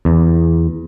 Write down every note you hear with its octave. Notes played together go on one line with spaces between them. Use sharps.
E2